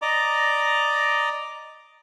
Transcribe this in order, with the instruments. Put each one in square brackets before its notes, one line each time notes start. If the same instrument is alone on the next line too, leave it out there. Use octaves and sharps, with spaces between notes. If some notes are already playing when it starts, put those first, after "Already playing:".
[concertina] D5 D#5 A#5 D6